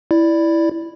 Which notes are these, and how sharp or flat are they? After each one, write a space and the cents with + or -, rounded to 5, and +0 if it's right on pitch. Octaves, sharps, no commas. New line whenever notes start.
E4 +0 D5 +0